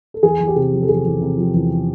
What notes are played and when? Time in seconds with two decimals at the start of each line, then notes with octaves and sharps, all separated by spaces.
0.14 A4
0.23 E2 G#4
0.40 E2
0.48 G4
0.56 C3 G#4
0.72 F3
0.82 A4
0.89 E2 G#4
1.05 E2
1.21 C3
1.38 F3
1.54 E2